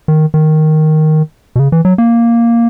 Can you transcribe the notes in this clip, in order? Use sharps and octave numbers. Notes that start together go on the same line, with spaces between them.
D#3
D#3
B2
C#3
E3
F#3
A#3